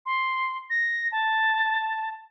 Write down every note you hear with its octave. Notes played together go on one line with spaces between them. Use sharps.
C6
A#6
A5